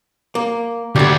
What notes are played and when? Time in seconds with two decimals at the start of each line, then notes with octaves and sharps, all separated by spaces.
0.35 A#3
0.96 D2 D3 G4